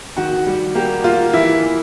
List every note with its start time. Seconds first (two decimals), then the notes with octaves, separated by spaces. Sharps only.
0.17 D#3 F#4
0.46 G3
0.75 A#3 G4
1.04 A#3 F4
1.33 E3 E4
1.63 E3